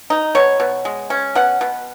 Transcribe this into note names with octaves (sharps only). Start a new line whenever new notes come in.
D#4
B2 C#5
B2
G#3
C#4
B2 F#5
B2